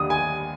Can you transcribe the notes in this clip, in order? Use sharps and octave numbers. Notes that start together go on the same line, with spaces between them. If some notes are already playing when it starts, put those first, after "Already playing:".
Already playing: D#2 D3 G3 D#6
G#5